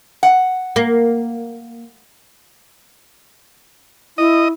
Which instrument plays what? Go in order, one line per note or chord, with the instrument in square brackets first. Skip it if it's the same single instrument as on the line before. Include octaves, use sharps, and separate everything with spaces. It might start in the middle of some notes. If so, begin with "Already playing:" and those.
[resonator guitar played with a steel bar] F#5
[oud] A#3
[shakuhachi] E4 [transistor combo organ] D#5